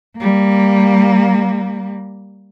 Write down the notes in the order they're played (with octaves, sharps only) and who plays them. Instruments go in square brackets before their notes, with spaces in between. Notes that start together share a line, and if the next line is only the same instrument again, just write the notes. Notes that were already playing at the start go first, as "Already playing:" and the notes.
[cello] G3 A#3